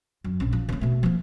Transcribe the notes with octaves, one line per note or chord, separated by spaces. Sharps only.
F#2
A#1 C#4
F3
C#3 A#3
B2 A3
F3 A#3